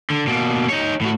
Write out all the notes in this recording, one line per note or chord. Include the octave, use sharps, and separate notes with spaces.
D3
B2 A#3
D#4 C#5
A2 F#4